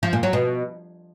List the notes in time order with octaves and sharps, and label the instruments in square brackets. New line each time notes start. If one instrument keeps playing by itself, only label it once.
[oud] F3
A#2
F#3
B2